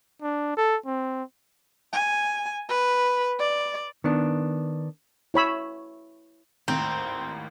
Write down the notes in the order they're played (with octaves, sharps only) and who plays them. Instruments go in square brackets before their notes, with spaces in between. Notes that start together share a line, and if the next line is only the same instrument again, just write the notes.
[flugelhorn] D4
A4
C4
[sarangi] G#5
B4
D5
[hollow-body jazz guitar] D#3 B3 D4
[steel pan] E4 C#5 B5 E6
[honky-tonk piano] G#1 D#2 A2 [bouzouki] C4 [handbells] A#5